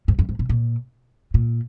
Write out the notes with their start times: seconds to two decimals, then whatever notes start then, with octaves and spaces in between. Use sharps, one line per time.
0.08 G#2
0.19 F#2
0.29 G#2
0.39 B2
0.49 A#2
1.34 A#2